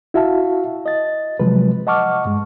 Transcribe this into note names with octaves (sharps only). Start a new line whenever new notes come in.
E4 F#4 E5 F5 A5
D#5 A6
C3 F3 F#3 G#3 B4
D#5 F#5 A5 C#6 D6 F6
G2 G#3